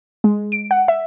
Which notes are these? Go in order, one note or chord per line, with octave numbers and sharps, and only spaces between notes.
G#3
D7
F#5
E5